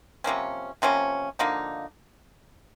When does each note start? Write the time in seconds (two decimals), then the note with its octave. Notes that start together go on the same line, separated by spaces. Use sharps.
0.24 C3 F3 A#3 C#4
0.82 C3 F3 A#3 C#4
1.39 D3 F3 A#3 D#4